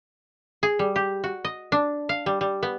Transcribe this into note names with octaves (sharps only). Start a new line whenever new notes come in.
G#4
G3
G4
F#4
D#5
D4
F5
G3
G3
B3